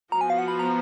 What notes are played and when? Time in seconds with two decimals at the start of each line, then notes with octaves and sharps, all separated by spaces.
0.12 F3 B3 F#4 A#5
0.21 G#5
0.30 F5
0.38 F#5
0.48 B5
0.59 A#5